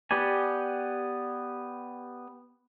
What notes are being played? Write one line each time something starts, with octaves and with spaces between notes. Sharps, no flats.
B3 G4 B4 D5 G#5